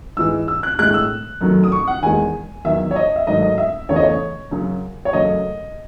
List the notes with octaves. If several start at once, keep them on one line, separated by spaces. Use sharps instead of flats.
G#2 E3 G#3 E6
E6
F#6
A2 G#3 F#6
E6
F#2 D#3 F#3 A3
D#6
C#6
F#5
E2 D#3 G#3 G#5
E2 D#3 F#3 E5
C#5
D#5
E5
G#2 D#3 F#3 A3 D#5
D#5
E5
E2 C#3 E3 A3 C#5
D#5
C#5
F#2 C#3 F#3
C#5
F#2 C#3 F#3 A3 D#5